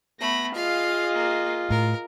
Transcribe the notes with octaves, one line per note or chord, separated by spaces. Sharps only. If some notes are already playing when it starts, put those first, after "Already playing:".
A3 B3 B5 A#6
F4 G#4 D#5 F5
A#3
A2 A#4